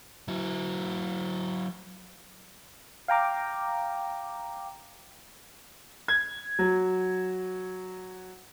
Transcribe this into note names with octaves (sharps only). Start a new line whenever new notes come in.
F#3 E4
F5 G5 A#5 D6
G#6
F#3